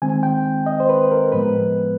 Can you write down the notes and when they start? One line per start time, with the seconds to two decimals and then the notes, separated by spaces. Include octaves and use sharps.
0.02 D#3 G#3 C4 G#5
0.23 G5
0.66 D#5
0.80 C5
0.89 B4
1.11 A#4
1.32 A2 F3 G#3 B3 B4